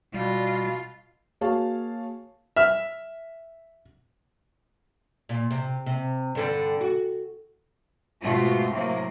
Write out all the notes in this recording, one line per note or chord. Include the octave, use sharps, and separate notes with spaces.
B2 G3 F4
A#3 F#4 G#4 C#5 F5 A5
E5 F6
A#2
C3
C3
G2 D3 G3
F#4
G#2 B2 A3 F4
A2 C3 F#3 A#3